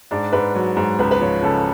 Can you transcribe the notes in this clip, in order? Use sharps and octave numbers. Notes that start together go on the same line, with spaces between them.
G#2 D4
G#2 B4
F#3
G#2
C#2 B4
B4
F3 C#5
C#3 A4